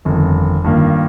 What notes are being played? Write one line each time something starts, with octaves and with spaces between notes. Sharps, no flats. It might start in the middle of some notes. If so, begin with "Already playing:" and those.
G1 F2 D#3
G2 D#3 A#3 F4